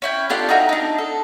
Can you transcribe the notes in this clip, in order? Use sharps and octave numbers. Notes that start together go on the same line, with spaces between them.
C#4 E4 G5
D4 F4 G4 A4
D#4 F#4 A#4 E5
D4 D#4
A4